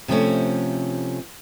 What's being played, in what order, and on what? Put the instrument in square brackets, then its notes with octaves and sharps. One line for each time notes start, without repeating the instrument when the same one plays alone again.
[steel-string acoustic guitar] C3 F3 A3 C#4